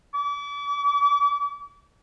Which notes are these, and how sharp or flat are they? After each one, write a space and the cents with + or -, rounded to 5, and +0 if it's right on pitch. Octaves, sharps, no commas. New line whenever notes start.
D6 -40